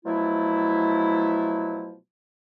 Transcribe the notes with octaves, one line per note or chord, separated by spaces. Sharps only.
B2 F3 F#3 A3 E4